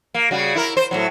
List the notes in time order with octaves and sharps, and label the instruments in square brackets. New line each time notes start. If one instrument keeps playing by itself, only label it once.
[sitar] A#3
C#3 G3 F#4
E4 A#4
C5
A2 C3 F#3